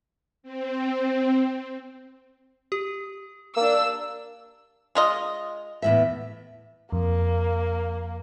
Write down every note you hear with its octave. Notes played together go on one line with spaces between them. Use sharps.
C4
G4
A#3 D4 E6
G#3 F4 D#5
E2 A2 E5
F2 A#3